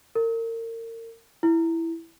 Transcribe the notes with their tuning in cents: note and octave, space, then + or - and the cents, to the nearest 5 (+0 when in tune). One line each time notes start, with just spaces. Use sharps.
A#4 -35
E4 +0